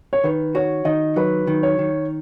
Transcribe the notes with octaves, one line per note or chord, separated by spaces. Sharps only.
C#5
D#3 B4
F#4 C#5
D#3 D#5
F#3 B4
D#3
C#5
D#3